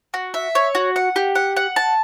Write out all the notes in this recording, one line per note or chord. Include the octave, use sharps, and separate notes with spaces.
F#4
E5
C#5
F#4
F#5
G4
F#5
F#5
A5